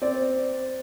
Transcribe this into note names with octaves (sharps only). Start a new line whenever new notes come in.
C4 D5